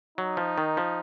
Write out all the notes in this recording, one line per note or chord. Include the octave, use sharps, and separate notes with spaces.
F#3 D#4
F3
D#3
F3